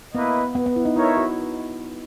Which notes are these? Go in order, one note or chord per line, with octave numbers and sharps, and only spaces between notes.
A#3 B3 E4 B4 D#5
B3
B3
E4
D#4
D#4 E4 A#4 C#5 E5
F#4